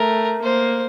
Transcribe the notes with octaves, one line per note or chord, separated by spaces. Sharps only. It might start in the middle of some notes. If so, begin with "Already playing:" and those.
Already playing: A3 A#4
A#3 C5